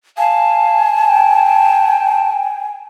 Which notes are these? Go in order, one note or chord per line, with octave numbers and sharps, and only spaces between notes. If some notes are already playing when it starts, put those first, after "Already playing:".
F5 G#5 A5
G5